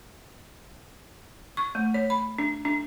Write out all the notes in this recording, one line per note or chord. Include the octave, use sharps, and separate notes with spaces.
C#6
A3
C#5
B5
D4
D4